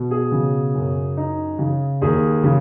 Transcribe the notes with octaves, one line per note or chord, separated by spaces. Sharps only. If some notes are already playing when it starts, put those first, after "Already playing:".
Already playing: B2
G#4
C#3
F#2
D#4
C#3
D#2 G#4
C#3